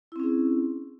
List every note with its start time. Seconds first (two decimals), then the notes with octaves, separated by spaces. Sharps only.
0.12 E4
0.16 C4
0.20 C#4
0.23 G#4